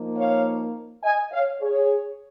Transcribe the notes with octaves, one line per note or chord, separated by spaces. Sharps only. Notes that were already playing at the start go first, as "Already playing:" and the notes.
Already playing: F3 A#3 D#4
C#5 F5
D#5 G#5
C#5 F5
G#4 C#5